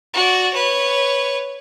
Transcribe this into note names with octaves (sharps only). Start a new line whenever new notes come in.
F#4 D5
B4 C#5